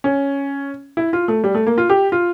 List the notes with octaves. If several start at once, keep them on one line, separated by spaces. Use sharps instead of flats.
C#4
E4
F4
A3
G3
A3
A#3
F4
G4
F4